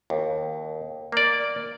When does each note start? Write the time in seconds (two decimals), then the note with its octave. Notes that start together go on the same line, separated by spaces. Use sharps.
0.10 D#2
1.12 A#3 D5